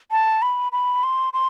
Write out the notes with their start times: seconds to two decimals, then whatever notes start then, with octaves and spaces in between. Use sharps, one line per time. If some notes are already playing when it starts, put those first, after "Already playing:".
0.11 A5
0.42 B5
0.72 B5
1.03 C6
1.33 C6